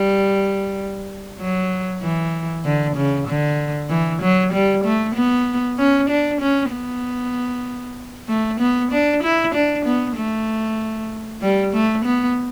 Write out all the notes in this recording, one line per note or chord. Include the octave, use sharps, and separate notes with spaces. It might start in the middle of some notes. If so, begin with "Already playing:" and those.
Already playing: G3
F#3
E3
D3
C#3
D3
E3
F#3
G3
A3
B3
C#4
D4
C#4
B3
A3
B3
D4
E4
D4
B3
A3
G3
A3
B3